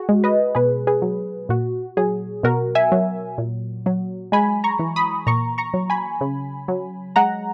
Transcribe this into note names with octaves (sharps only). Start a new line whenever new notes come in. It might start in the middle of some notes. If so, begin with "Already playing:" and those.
Already playing: F#4 G#4
G#3
B4 D#5
B2 G#4 B4
G#4 B4
F#3
A#2 F#4
F#3 G#4
B2 F#4 A#4
E5 G#5
F#3
A#2
F#3
G#3 G#5 B5
A#5 C#6
E3
B5 D#6
A#2 A#5 C#6
A#5 C#6
F#3
G#5 B5
C#3
F#3
G#3 F#5 A#5